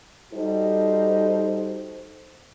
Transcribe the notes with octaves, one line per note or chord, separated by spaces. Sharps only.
G3 D#4 F#4 A4 C5